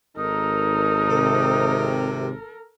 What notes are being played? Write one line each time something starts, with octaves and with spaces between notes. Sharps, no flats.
G#1 D#4 A4 A#4
C3